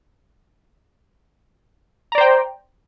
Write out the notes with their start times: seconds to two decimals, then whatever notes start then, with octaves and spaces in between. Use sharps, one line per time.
2.12 A#5
2.15 D5
2.18 C5
2.21 G5